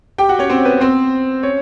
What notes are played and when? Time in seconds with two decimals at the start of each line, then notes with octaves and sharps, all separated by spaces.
0.18 G4 G5
0.29 F#4 F#5
0.39 C#4 C#5
0.50 C4 C5
0.65 B3 B4
0.81 C4 C5
1.43 C#4 C#5